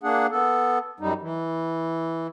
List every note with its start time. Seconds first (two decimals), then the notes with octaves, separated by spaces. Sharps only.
0.03 A#3 D4 G#4 F#5
0.31 B3 A4
1.00 F#2 G3 D#4
1.22 E3